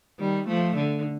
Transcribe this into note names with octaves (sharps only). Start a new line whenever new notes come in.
D#3 G3
F3 A3
D3